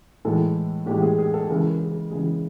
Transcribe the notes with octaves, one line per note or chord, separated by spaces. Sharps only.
A2 E3 G#3 A4
A2 E3 G#3 G4
G#4
G#4
A4
C#3 E3 G#3 A#4
G#4
C#3 E3 G#3 G#4